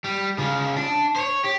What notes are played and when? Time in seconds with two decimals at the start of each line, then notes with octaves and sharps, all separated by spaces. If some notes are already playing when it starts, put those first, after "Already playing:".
0.04 G3
0.38 C#3 F4
0.76 D4
1.16 C5 C#5
1.44 G4